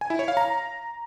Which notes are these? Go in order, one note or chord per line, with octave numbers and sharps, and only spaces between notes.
G#5
E4
C#5
F5
A#5